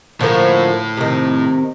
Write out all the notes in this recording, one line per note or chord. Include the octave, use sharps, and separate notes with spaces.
A2 D3 F3 A#3
C3 D#3